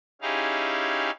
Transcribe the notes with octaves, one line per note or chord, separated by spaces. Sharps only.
C#4 D#4 E4 G4 G#4 F5